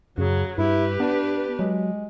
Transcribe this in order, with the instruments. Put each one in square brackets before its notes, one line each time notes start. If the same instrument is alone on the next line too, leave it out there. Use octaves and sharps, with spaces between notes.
[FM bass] F#2 [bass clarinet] C#3 [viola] F#3
[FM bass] G2 [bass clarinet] E4 [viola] G4 B4
[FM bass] B3 [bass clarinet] D4
[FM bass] F#3 [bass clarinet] G#3